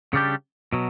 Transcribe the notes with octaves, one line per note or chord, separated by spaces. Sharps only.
C#3 G3 D4 G4
B2 F#3